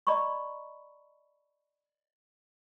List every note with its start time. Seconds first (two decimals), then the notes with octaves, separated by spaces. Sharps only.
0.07 D5 D#5 A#5 B5 C#6